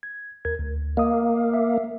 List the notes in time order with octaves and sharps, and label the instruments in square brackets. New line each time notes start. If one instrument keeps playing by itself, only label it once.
[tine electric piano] G#6
D#2 A#4 G#6
D2
[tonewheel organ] A#3 [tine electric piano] D#5 D#6
[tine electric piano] E5